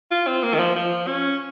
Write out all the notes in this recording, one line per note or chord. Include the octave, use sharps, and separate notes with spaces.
F4
C4
A#3
D#3
F3
F3
C#4